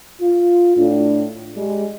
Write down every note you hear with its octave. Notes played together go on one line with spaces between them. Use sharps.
F4
A2 D4
G3 G#3